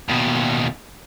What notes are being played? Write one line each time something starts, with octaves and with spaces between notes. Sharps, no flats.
D#2 B2